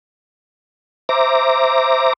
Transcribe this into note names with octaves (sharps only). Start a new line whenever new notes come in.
C5 E5 A#5 D6 A#6